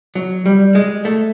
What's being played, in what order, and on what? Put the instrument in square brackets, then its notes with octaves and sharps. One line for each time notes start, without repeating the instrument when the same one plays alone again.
[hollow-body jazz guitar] F#3
G3
G#3
A3